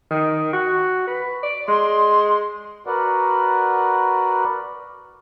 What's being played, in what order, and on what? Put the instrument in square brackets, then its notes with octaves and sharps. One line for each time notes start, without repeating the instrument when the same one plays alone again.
[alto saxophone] D#3
F#4
B4
D5
[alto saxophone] G#3 [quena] C6
[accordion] F#4 A#4 B4 D5 F#5